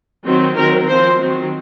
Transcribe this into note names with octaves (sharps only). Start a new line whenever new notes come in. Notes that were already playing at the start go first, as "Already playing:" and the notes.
D#3 F#3 C4
D#3 F#3 C4 A#4
F3 C4 C5
D#3 F#3 C4